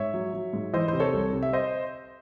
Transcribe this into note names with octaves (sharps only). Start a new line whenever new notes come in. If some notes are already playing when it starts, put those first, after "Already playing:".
Already playing: G#2 C#5 E5
F#3
F#3
G#2
E3 C5 D#5
C3 C5
A4 C#5
C2
C3
E5
C5 D#5